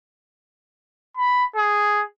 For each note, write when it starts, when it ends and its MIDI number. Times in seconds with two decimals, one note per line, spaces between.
1.17 1.45 83
1.56 2.04 68